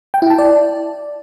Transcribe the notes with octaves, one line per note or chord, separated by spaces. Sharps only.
G5
E4
A5
D5